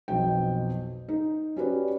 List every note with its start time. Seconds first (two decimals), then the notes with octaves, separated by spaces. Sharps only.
0.08 B1 F2 B2 G5
1.09 D#4
1.57 C#4 F#4 G4 B4 D5